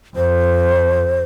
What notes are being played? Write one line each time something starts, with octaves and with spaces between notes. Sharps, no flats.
F2 C5